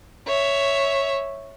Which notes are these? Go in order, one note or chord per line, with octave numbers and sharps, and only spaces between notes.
C#5 E5